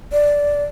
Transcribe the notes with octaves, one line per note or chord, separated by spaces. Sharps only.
D5